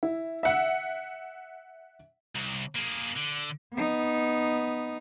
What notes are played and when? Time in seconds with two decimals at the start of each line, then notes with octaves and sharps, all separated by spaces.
0.03 E4
0.43 E5 F#5
2.36 C2
2.76 A#3 G#4
3.16 D3
3.74 B3 D#4